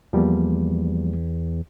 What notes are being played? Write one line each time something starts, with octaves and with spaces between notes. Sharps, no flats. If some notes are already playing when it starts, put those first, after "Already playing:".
E2 F3 G3 A#3